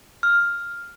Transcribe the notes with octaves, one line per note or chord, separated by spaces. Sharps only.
F6